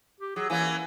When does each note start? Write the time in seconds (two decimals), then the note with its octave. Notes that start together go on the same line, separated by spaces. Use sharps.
0.20 G4
0.36 F#3 G#4
0.50 E3 A#3 C#4 G#5